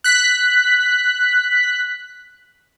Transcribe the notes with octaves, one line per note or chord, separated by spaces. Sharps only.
F#6 B6